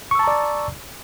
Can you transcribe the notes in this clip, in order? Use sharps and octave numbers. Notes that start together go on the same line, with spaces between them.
D5 A5 A#5 C#6 E6